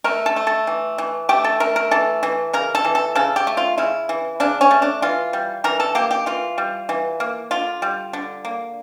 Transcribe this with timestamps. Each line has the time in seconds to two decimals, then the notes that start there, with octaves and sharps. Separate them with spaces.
0.04 A3 A#4
0.26 A4
0.36 A3
0.47 A4
0.67 E3
0.98 E3
1.29 A3 G4
1.44 A4
1.60 A3 A#4
1.76 A#4
1.91 E3 A4
2.23 E3
2.53 C#3 A#4
2.75 A4
2.85 E3
2.95 A4
3.15 C#3 A4
3.36 G4
3.47 A3
3.57 F4
3.78 C#3 E4
4.09 E3
4.40 C#3 D4
4.61 C#4
4.71 A3
4.82 D4
5.02 E3 F4
5.33 G3
5.64 E3 A#4
5.80 A4
5.95 A#3 G4
6.11 G4
6.26 E3 F4
6.58 G3
6.89 E3
7.20 A#3
7.51 D3 F4
7.82 G3
8.13 D3
8.45 A#3